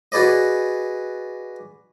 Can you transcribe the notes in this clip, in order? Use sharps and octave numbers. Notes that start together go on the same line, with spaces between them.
F#4 G#4 B4 D5 D#5